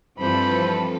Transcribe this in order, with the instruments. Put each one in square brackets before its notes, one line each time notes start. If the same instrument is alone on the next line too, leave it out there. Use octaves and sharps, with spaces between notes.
[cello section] G2 E3 F3 [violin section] C4 A4 B4 [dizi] C5 [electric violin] B5